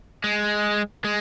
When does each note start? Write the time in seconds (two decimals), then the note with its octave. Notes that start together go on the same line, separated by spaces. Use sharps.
0.24 G#3
1.04 G#3